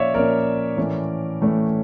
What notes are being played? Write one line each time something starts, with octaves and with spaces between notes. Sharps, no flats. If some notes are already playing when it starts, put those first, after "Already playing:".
Already playing: A#2 F3 C#4 C#5 D5 E5 F5
A#2 F3 C#4 A#4 D5
A2 E3 A3 C#4
A2 E3 A3 C#4